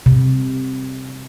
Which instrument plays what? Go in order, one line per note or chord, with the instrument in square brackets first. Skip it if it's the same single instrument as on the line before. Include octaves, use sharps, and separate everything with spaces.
[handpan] C3